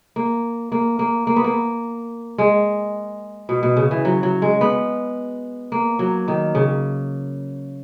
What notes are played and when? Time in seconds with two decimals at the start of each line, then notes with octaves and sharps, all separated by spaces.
0.16 A#3
0.72 A#3
0.99 A#3
1.27 A#3
1.36 B3
1.44 A#3
2.38 G#3
3.49 B2
3.63 B2
3.77 C#3
3.91 E3
4.05 F#3
4.23 F#3
4.42 G#3
4.61 B3
5.72 A#3
5.99 F#3
6.28 D#3
6.55 C#3